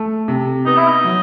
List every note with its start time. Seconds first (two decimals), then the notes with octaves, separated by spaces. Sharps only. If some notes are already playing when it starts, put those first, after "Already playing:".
Already playing: A3
0.28 C3
0.65 B3 D#4
0.77 E4
0.88 D#4
1.04 F#3